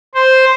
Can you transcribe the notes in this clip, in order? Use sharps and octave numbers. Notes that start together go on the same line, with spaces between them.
C5